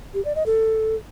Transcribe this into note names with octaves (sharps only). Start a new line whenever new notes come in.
G4
D5
D#5
A4